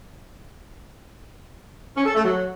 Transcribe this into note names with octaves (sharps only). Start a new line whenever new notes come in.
C#4
A4
A3
F#3